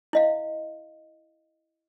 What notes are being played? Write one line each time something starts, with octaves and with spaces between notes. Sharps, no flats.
E4 D#5 F5